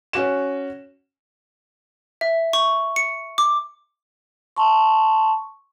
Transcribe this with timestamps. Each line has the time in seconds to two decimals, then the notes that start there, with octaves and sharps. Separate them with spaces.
0.13 C#4 F#4 E7
2.21 E5
2.53 C#6
2.96 C#7
3.38 D6
4.56 A5 C6 C#6